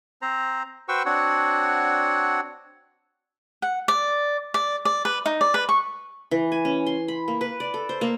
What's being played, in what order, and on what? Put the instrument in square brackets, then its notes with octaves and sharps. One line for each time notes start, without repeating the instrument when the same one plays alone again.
[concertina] C4 C5 A#5
F#4 B4 C5 G5 C#6 E6
C4 D4 F#4 C#5 F#5
[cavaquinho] F#5
D5
D5
D5
B4
D#4
D5
B4
C#6
[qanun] E3
G#5
C#4
C6
B5
A#3
B4
D5
A4
C5
A#3